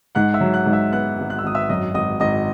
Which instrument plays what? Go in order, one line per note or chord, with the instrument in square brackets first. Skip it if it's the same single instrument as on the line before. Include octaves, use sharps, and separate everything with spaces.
[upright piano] G#2 [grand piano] F#5 F#6
[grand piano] E5 E6
[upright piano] F#3
[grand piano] F#5 F#6
[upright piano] G#2
[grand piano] E5 E6
[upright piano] B3 [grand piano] F#5 F#6
[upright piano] G#1
[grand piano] F#6
E6
[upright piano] G#1 [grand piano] D#6
[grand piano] E5 E6
[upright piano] F#2 [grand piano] D#5 D#6
[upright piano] G#1 [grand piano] D#5 D#6
[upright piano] G#1 [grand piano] D#5 D#6